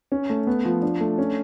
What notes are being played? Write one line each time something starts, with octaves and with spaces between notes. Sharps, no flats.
C#4
A3
B3
F3
D4
A3
C#4